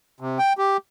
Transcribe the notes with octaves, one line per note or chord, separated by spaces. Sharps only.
C3
G5
G4